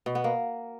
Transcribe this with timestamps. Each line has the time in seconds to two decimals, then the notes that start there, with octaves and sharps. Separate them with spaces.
0.06 B2
0.15 B3
0.24 A#3